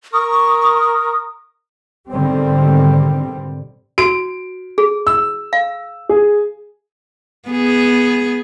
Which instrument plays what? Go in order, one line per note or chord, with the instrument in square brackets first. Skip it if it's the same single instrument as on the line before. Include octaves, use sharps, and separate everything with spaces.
[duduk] A#4 [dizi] C#6 [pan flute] D#6
[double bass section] G#1 B2 D3 D#3 G3 C4
[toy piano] F#4 [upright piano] D7
[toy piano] G#4
[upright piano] E6
[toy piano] F5
[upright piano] G#4
[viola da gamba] B3 G#4